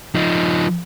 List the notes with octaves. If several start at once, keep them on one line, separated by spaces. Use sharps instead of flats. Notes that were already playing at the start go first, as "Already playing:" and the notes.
F3 D#4